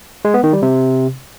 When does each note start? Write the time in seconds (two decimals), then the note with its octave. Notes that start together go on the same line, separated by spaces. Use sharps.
0.25 G#3
0.34 B3
0.44 D#3
0.53 G3
0.62 C3